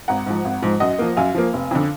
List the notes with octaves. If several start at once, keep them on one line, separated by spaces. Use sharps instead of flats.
G#1 F#5 A#5
G#2 F3
G#1
G#2 F3
F#2 D#5 F#5
F3 A#3
F#2 F5 G#5
F3 A#3
F1
F2 D3